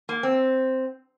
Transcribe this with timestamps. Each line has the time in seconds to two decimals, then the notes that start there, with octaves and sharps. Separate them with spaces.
0.09 A#3
0.23 C4